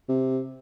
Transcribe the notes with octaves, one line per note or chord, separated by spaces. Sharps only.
C3